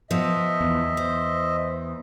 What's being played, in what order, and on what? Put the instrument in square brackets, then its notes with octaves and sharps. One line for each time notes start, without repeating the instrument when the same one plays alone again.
[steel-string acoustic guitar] F3 B3 [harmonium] D#5 E5
[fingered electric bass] E2
[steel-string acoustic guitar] C5